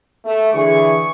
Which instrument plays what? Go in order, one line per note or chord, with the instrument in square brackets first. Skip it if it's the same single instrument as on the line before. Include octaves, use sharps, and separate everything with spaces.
[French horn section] A3
[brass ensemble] D3 E3 [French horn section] G#4 [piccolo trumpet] C#6